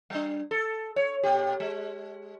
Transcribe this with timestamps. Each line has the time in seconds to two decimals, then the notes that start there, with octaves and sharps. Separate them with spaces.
0.10 G3 D4
0.51 A4
0.96 C#5
1.23 A#2 G4
1.60 G#3